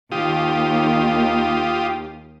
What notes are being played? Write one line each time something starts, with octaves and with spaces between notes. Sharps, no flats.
D#2 F4 G4 D#6